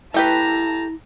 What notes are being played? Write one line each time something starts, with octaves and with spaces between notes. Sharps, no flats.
A3 E4 G4 B4 A5 A#5